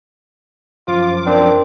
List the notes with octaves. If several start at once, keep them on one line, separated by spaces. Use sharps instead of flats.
F#2 F3 F4 D6
C4 D4 A#4